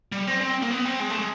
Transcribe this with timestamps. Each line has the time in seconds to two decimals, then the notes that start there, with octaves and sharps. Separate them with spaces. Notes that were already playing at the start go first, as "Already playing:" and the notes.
0.12 G3
0.27 C4
0.41 C4
0.62 A#3
0.71 B3
0.85 C4
1.00 G#3
1.10 A3
1.19 G#3